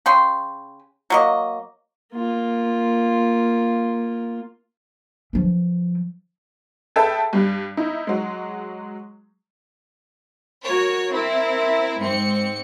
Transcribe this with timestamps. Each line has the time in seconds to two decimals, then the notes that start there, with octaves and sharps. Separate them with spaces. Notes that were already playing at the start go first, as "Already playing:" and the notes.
0.06 C#3 G5 C6
1.10 F#3 A#3 D#5
2.14 A#3 F4
5.33 E3 F3
6.96 G#4 A4 B4 E5 G5 A5
7.33 G2 G3
7.77 D#4 E4
8.07 F#3 G#3
10.64 F#4 A#4 C#5
11.12 C4 E4 A#4
12.01 G#2 C4 C#7